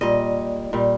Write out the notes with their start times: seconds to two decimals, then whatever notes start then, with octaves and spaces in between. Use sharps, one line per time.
0.01 A#2 G3 D#5
0.73 A#2 G3